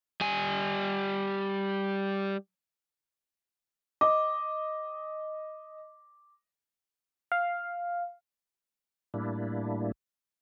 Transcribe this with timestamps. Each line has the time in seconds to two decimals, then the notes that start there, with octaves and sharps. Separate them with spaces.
0.21 G3 G#5
4.01 D#5 D6
7.32 F5
9.14 A2 G3 A#3 D4 E4